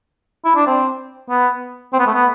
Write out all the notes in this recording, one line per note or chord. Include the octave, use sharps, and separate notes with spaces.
E4
D4
C4
B3
C4
B3
A3
B3